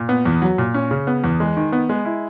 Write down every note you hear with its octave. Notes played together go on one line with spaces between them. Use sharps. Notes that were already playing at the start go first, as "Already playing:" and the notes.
Already playing: A#2
B3
E2
F#3
A#2
C#4
C#3
B3
E2
G#3
D#3
B3
G#3
E4